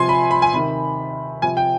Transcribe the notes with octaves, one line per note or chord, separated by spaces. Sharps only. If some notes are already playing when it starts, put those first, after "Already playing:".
Already playing: C3 F3 G#5 C6
B5
B5
G#5
C3 D#3 B5
C3 F3 G#5
G5